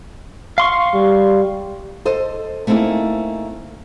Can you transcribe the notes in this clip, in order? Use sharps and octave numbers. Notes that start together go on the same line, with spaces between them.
F5 C6 C#6
G3
A4 C5 D#5
A3 A#3 C4 D#4 E4 G#4